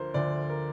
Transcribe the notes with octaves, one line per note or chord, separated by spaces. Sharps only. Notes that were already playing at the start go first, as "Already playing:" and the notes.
Already playing: D2 D3 F3 A#4 C5
D2 D3 F3 D5
A#4